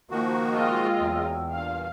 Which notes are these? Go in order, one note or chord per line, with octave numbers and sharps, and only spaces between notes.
D#3 F3 A#3 F#4
G#3 F4 D#5 G5 E6
E2 F#3
G2 A#2 F5